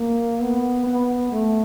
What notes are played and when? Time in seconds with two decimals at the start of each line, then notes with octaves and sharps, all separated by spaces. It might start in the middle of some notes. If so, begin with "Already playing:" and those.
Already playing: A#3
0.42 B3
0.87 B3
1.32 A3